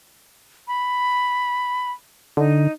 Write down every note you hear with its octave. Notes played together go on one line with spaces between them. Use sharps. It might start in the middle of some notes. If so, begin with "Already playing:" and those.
B5
D3 D#4